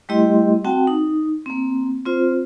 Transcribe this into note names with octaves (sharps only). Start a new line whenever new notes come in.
G3 A3 E4 G4 D#5 C6
C4 F#4 F#5 G5 A5
D#4
A#3 C4
C4 F4 C5